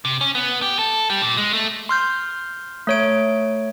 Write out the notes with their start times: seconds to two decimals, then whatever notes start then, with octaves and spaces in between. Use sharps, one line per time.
0.05 C3
0.21 C#4
0.35 B3
0.62 G4
0.79 A4
1.10 G3
1.22 A#2
1.37 G#3
1.53 A3
1.89 C6 F6 G6
2.87 A3 C#5 D7